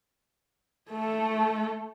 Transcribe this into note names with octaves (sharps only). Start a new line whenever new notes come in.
A3 A4